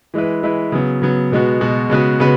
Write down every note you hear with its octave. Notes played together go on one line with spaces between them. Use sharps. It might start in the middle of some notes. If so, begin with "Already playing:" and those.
E3 G#3 E4 B4
E3 G#3 E4 B4
C#3 F#3 B3
C#3 F#3 B3
B2 G#3 B3 F#4
B2 G#3 B3 F#4
C#3 G#3 B3 F#4 B4
C#3 G#3 B3 F#4 B4